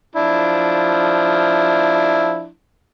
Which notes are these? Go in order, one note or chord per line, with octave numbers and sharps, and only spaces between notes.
F3 D4 E4